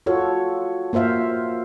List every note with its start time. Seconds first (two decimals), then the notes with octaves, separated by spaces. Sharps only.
0.06 F4 F#4 A4 C#5
0.93 A#3 F4 C5 E5 F5